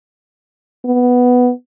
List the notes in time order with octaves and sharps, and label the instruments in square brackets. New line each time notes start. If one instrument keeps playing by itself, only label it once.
[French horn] B3